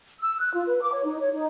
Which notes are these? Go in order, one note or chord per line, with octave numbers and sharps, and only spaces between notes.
E6
F#6
F4
B4
D6
C#5
D#4
C#5
D#4